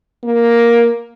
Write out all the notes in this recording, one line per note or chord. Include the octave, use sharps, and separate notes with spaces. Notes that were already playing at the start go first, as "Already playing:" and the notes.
A#3